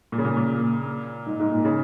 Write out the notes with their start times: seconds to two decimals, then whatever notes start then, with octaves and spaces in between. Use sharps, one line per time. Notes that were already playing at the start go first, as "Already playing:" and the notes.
0.12 A#2
0.18 C#3
0.25 A#2
0.37 A#2
1.26 G#2
1.40 G#2
1.52 A#2
1.65 C#3